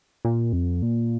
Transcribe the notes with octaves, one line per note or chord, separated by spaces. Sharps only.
A#2
F2
A#2